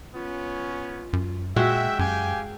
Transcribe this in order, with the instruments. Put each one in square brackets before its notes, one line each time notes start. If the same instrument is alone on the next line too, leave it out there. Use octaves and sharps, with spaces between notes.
[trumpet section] B3 C#4 [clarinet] F4
[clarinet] F4
[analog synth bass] F#2
[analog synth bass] A#2 [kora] G#3 F#4 [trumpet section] E5 [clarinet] G5
[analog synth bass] F#2 [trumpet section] G4 F5 G#5